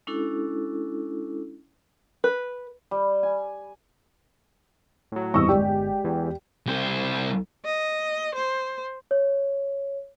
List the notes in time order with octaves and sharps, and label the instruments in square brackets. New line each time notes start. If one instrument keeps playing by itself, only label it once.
[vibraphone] G#3 C#4 D4 E4 F#4 A4
[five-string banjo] B4
[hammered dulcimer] G3
G#5
[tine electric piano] A2 F#3
[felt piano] G#1 E2 G2 [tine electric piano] D#5 [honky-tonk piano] C#6 E6
[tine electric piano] G1 [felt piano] G#3 D5 [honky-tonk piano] G4
[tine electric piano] E2 E3
[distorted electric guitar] C2 C5
[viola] D#5
C5
[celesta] C#5